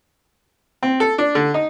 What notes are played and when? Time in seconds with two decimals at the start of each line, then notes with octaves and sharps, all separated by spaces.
0.83 C4
1.00 A4
1.18 D4
1.35 D3
1.54 D#4